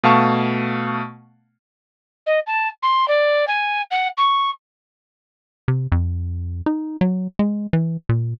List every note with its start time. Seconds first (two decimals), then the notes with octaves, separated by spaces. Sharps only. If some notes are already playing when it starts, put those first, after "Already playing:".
0.03 B2 A3 F5 A5 C#6
2.26 D#5
2.47 A5
2.82 C6
3.08 D5
3.47 G#5
3.91 F#5
4.17 C#6
5.68 C3
5.92 F2
6.66 D#4
7.01 F#3
7.39 G#3
7.73 E3
8.09 A#2